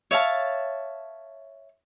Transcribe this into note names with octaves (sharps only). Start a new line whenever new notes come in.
C#5 E5 F5 A5